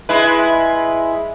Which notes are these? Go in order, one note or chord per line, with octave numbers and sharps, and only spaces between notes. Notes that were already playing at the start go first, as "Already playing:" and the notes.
G#3 E4 B4